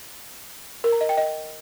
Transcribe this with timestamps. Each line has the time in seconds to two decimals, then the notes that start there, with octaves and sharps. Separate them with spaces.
0.84 A#4
0.92 A#5
1.01 D#5
1.09 G5
1.18 D#5